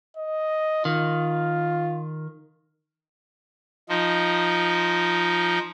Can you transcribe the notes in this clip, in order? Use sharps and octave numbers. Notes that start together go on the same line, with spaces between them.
D#5
D#3 F4
F3 D#4